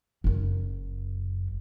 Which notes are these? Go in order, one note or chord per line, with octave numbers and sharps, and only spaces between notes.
F#1 F#2